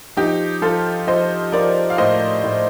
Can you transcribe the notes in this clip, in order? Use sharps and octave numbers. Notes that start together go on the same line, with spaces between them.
F3 D#4 G4
F3 F4 A4
F3 C5 D#5
F3 A#4 D5
F5
A2 C5 D#5
A2